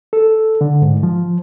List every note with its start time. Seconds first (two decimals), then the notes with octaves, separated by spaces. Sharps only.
0.13 A4
0.61 D3
0.82 G#2
1.03 F3